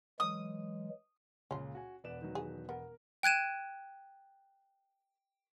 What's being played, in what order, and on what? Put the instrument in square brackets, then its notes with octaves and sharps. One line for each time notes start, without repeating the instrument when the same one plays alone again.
[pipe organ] E3 F#3 G#3 [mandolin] D#6
[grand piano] C#2 A#2 [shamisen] C#4 F4
[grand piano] F#4 G#5
[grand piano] E1 B4 E7 [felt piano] D5 F#5
[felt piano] D#3 F#3
[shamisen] G#4
[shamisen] B3 [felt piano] A#4
[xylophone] G5 F#6 G#6 D#7 E7